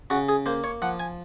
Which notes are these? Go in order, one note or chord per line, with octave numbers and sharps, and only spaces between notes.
C#3 F#4
G#4
A#3 C5
C#5
F3 F#5
G#5